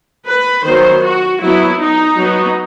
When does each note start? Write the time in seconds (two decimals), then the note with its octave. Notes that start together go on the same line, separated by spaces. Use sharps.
0.26 B4
0.64 D#3 F#3 B3 C5
1.03 F#4
1.41 F#3 B3 E4
1.80 D#4
2.18 F#3 B3